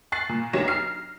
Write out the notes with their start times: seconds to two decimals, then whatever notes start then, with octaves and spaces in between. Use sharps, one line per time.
0.12 C#6 F#6 A6 C7
0.29 A#2
0.53 B1 D4 G4 C#5 A#6 E7
0.68 F6 C7